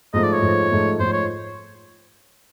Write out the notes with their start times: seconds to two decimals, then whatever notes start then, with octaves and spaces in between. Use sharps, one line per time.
0.14 G#2 F3 A3 D#5
0.23 D5
0.33 C#5
0.42 G#2 F3 A3
0.71 G#2 F3 A3
0.99 G#2 F3 A3 C5
1.13 C#5